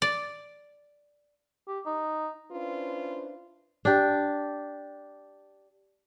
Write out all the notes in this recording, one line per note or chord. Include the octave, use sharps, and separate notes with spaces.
D5
G4
D#4
C#4 D4 E4 F4 B4 C5
D4 G4